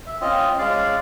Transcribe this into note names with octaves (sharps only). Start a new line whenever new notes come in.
E5
C4 C#4 F4 D#5
G#3 C#4 D5 F5